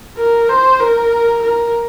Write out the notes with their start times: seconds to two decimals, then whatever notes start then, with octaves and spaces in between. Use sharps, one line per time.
0.18 A#4
0.50 C5
0.81 A#4
1.43 A#4